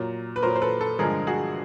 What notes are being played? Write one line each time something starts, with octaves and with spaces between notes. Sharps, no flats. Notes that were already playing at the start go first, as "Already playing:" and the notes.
Already playing: A#2 F#3
B4
A#2 F#3 A#4 C5
C5
A4 B4
A4 B4
G2 D3 F3 G#3 G#4 A#4
F#4 G#4